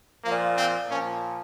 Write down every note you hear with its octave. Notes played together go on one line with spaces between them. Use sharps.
A#2 F3 A#3
C4
A#2 F3 C#4